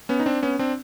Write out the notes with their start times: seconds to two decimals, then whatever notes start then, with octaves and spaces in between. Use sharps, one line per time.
0.09 B3 C#4
0.20 D#4
0.26 C4 D4
0.42 B3 C#4
0.59 C4 D4